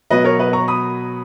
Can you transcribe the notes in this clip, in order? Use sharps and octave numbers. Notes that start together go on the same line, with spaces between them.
B2 F#3 B4 D#5
A#4 C#5
B4 D#5
A#5 C#6
B5 D#6